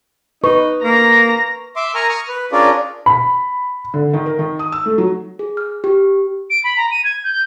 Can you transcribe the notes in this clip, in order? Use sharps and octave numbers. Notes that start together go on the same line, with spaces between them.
D#4 B4 C#6
A#3 A#5 A#6
E5 C6 D6
A#4 G#5 A#5 C#6 F6
C#6 D#6 F6
B4
C#4 D4 F4 G#4 A#4 D5
B5
D3
D#3
A#4
D#3
D#6
E6
A3
F#3
G#4
F6
G4
D7
B5
A#5
D#7
G#6
G6